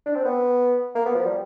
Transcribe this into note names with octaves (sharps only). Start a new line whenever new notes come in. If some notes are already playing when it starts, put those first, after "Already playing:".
D4
C4
B3
A#3
B3
F3
G3